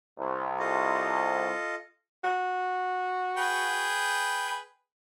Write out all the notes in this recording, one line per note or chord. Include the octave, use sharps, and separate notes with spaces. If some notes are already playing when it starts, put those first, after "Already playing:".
C2
F4 A4 D#5
F#4
G#4 B4 G5